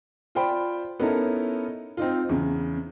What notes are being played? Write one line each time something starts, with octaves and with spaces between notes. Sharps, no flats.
F4 C5 D5 G5 B5
B3 C#4 D#4 E4 A4 A#4
C4 D#4 F4
E2 C#3